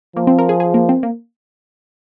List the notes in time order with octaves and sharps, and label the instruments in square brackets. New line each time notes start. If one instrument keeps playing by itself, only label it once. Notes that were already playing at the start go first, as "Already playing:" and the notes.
[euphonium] F3 [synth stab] A#3
[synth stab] C4
A#4
G#4
G#4
A#3
C4
A#3